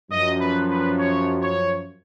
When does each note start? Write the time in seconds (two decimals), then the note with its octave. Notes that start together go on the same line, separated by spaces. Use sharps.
0.11 F#2 F3 D#5
0.40 B4
0.70 B4
0.99 C#5
1.41 C#5